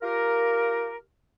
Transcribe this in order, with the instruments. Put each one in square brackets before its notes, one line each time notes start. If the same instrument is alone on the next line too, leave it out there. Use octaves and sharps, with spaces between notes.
[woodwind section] F4 G4 A#4